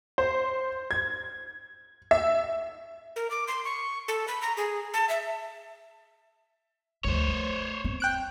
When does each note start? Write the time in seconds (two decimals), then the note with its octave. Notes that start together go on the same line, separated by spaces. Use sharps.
0.18 C5
0.91 G#6
2.11 E5
3.16 A#4
3.31 D6
3.48 C6
3.64 C#6
4.08 A4
4.28 B5
4.42 A#5
4.57 G#4
4.94 A5
5.09 E5
7.04 D2 F3 C5 C#5
7.28 A3
7.84 C4
8.00 G5 F#6 D7